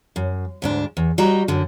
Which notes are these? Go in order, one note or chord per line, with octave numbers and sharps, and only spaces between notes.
F#2
D2 G#2 D4
E2
G3 F#4 D#5 A#5
F#2 D3